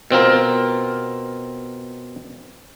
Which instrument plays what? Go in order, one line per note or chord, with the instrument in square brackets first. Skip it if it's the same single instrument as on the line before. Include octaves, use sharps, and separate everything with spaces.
[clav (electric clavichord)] B2 C4 F4 A#4